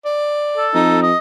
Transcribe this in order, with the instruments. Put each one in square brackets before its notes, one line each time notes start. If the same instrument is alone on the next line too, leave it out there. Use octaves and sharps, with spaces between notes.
[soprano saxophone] D5
[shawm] A4
[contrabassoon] F2 [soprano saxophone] D#4
[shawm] D#5